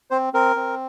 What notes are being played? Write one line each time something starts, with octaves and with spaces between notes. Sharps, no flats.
C4 C5
C4 A#4
C4